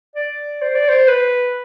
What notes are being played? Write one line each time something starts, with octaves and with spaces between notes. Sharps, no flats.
D5
C5
D5
C5
B4